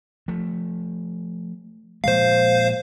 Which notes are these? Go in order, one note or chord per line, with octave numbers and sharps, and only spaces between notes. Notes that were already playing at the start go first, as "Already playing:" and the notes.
F3 A3
A#2 F3 G#3 C5 F5